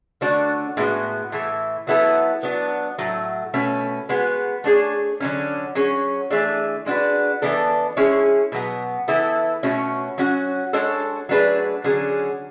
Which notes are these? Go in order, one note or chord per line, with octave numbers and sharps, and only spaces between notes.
D3 A3 D4 F#4 C#5
A2 G#3 B3 F#4
A2 E3 A3
F#3 B3 E4 A4
F#3 B3 D4
A2 F#3 A3
B2 A3 C#4
G#3 B3 F#4 B4
A3 D4 G#4 C#5
D3 F#3 C#4
F#3 C#4 G#4 C#5
E3 A3 D4 G#4
G#3 D4 F#4 B4
E3 B3 D4 A4
G#3 C#4 E4 G#4 C#5
B2 F#3 B3
E3 B3 E4 A4
B2 A3 C#4 F#4 C#5
F#3 C#4 F#4
G#3 D4 F#4 A4 C#5
F#3 A3 D4 G#4 B4
D3 F#3 C#4 G#4